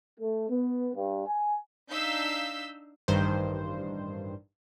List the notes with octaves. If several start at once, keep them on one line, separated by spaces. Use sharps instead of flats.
A3
B3
G2
G#5
D4 D#4 F5 E6 G6 B6
A1 G2 D#3 C5